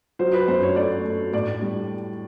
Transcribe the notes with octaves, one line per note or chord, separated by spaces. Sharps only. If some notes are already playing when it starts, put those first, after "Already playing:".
F#3 C5
B4
F#2 C5
C#5
A3 D5
A3
A2 D5
G3